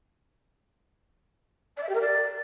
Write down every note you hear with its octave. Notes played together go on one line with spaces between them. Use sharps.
D5
E5
G4
A#4
D5